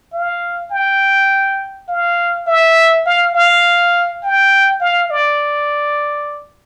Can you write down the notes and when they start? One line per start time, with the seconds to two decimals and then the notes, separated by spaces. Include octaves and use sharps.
0.13 F5
0.71 G5
1.88 F5
2.47 E5
3.06 F5
3.35 F5
4.23 G5
4.81 F5
5.10 D5